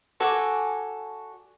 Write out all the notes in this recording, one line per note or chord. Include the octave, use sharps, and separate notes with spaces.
F#4 A4 D5 G#5